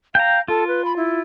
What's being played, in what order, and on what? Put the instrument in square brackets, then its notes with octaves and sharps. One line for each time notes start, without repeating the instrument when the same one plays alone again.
[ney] F5 [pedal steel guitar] G5 A#5
[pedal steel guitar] F4 [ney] A4
[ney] B4
B5
E4